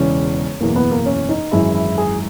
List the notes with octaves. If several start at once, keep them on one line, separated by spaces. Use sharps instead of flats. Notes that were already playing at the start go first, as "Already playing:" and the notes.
Already playing: E1 E2 C#3 E3 C#4
F#1 E2 B2 A#3
B3
A#3
C#4
D#4
G#1 F#2 E3 G#3 E4
E4
G#4